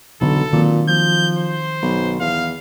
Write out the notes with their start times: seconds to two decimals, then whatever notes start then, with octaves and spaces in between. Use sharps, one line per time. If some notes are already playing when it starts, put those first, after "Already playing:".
0.21 B1 D3 E3 A4
0.53 A#2 D#3 F#3 C4
0.89 F3 G6
1.38 C5
1.82 B1
2.20 E2 F5